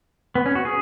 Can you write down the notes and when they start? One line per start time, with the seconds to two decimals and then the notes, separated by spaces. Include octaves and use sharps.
0.35 B3
0.46 C#4
0.55 F#4
0.65 G#4